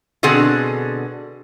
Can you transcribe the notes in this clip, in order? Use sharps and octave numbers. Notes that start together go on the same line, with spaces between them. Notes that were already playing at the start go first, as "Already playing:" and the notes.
B2 D3 C4 G#4 F#5